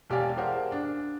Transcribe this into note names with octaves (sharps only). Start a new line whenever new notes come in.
E1 G4 D5 F5 G#5
G4 G#4 A#4 C5 F5 F#5
D4